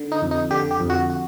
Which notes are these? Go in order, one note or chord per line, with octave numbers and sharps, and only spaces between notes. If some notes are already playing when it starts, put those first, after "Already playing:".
Already playing: D3
D#4
F2
D#4
D3 G4
G4
F2
F#4
F#4